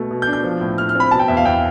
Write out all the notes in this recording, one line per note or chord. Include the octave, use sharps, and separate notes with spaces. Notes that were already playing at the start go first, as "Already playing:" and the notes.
Already playing: B2 A3
B2
G6
D4
G6
F3
A2
A2 F6
F6
C4 B5
B2 A5
G5
E2 E5
F5
E2 G5